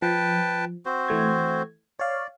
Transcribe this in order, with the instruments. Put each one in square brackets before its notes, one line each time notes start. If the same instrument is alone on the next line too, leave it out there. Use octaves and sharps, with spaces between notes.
[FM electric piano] F3 [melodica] B4 G5 A5
[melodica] C4 F#4 C5
[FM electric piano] E3 A3 G#6
[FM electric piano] C#5 F5 [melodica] D5